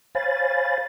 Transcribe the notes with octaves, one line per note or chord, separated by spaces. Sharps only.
C5 C#5 F5 G#5 B5 A6